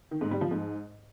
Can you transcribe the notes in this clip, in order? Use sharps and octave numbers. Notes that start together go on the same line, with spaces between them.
D#3
G#2
G3
F3
G#2